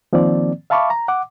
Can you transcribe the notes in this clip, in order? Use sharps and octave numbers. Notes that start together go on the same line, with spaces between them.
D#3 F3 A#3 C4 D5
E5 F5 A5 B5 C#6 D6
A#5
F#5 D6